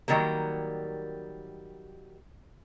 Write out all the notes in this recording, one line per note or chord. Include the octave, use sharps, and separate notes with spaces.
D#3 F#3 G3 A#3